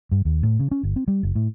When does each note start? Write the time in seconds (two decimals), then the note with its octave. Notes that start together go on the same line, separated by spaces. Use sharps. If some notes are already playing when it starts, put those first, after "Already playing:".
0.12 G2
0.25 D#2
0.43 A2
0.59 C#3
0.71 C#4
0.83 G1
0.96 C4
1.08 G3
1.23 F#1
1.35 A2